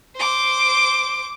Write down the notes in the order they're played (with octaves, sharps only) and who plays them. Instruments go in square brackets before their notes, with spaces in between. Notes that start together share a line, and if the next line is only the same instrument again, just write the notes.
[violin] C5 D6